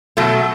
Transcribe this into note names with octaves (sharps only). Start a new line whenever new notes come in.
B2 F#3 A3